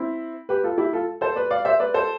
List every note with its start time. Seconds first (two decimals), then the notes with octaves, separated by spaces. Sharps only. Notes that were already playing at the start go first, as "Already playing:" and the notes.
Already playing: C4 E4
0.49 G4 B4
0.64 F4 A4
0.78 E4 G4
0.93 F4 A4
1.21 A4 C5
1.36 B4 D5
1.51 D5 F5
1.65 C5 E5
1.80 B4 D5
1.94 A4 C5